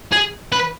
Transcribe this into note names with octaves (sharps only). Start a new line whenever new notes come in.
G#4
B4